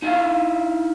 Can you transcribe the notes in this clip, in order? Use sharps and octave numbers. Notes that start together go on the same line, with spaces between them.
D#4 E4 E5 F5